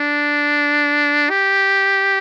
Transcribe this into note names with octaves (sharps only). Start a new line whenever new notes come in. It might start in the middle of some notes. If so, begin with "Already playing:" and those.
Already playing: D4
G4